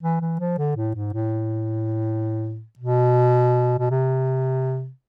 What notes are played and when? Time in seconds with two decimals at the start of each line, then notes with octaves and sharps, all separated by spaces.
0.03 E3
0.21 E3
0.40 F3
0.58 D3
0.77 A2
0.95 G#2
1.13 A2
2.79 B2
3.79 B2
3.90 C3